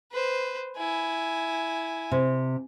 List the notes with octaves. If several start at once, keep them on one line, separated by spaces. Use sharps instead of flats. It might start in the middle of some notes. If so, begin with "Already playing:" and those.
B4 C5
E4 G#5
C3